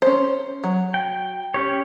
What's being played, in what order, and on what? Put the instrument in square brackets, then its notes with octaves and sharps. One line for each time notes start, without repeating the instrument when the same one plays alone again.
[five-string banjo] C#4 C5
F#3
[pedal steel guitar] G5
C#4 G4 C#5